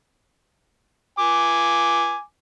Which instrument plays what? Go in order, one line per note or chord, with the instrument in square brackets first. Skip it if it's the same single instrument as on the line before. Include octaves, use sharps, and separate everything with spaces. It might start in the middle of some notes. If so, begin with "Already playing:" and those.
[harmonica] G#5 D6